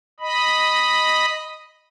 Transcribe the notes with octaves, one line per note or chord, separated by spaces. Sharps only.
D#5 B5